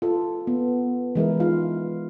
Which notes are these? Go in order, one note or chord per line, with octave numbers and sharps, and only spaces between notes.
F4 A4
B3
E3 G#3 E4 A#4
D#4 F4 F5